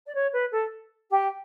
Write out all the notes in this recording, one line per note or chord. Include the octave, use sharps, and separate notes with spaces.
D5
C#5
B4
A4
G4